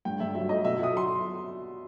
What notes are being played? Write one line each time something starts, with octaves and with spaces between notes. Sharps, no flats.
G2 G5
G2 E5
F#3 E5
A3 D#5
B2 E5
B2 D#6
F#3 C6